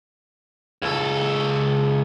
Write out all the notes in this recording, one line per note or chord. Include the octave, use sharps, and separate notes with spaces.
C#2 A4